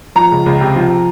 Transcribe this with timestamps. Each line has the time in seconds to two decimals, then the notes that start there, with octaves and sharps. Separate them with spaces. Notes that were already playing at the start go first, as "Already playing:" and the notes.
0.15 F3 A#5
0.31 C#2
0.46 C#2
0.61 C3
0.75 F3